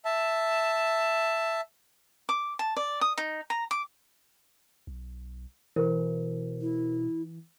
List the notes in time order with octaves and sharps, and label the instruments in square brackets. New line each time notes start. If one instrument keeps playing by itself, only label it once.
[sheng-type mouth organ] E5 A5
[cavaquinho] D6
A5
D5
D#6
D#4
A#5
D6
[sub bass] B1
[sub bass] B2 [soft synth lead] E3 [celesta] A4 A#4 C5
[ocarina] E4